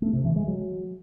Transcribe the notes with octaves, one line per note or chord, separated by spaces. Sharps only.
A3
C3
E3
G#3
F#3